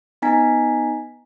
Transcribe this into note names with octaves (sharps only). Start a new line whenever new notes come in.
B3 D#4 G#5 A#5 B6